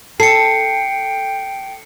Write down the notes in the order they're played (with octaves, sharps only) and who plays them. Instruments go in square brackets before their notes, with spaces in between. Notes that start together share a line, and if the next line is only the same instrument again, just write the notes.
[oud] A4 [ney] G5 [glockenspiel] C7 C#7